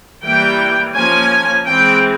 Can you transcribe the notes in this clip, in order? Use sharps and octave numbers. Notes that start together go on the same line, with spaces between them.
E3 G3 A#3 G5
F3 A#3 C#4 G#5
E3 G#3 C4 G5